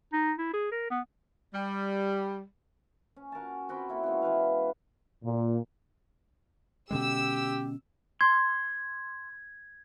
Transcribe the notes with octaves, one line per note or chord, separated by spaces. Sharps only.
D#4
E4
G#4
A#4
B3
G3
C#4
F#4 A#4 G#5 A5
C4 F#4 G5 B5
A#3 E4 A4
G#3 B3 C#4 F#4
E3 B4 E5 F5
A#2
B2 D3 G#3 C#4 G4 E6
C6 G#6